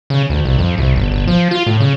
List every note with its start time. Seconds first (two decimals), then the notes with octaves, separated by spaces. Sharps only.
0.10 C#3
0.30 D2
0.45 C2
0.58 F2
0.78 C2
0.96 G1
1.11 G1
1.28 F3
1.51 F4
1.66 A2
1.80 C#3